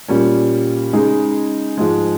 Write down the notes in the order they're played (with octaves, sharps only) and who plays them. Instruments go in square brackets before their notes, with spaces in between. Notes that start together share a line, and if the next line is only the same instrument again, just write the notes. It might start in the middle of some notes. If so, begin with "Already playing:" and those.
[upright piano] A#2 G3 C#4
C#3 G#3 D#4 G#4
G#2 F3 G#3